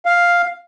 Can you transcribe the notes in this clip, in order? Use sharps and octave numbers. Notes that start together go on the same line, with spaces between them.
F5